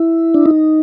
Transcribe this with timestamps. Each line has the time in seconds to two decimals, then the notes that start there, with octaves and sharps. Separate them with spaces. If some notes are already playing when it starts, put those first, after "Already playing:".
Already playing: E4
0.34 D4
0.46 D#4